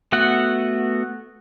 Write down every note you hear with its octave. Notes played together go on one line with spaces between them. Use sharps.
A3 B3 F#4 F#5